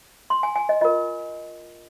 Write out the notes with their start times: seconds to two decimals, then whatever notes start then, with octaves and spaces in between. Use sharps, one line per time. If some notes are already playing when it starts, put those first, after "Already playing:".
0.30 C6
0.43 G#5
0.56 G#5
0.69 D#5
0.81 F4 A#4 D#5